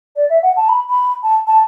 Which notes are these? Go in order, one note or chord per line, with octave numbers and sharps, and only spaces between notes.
D5
E5
F#5
A5
B5
B5
A5
A5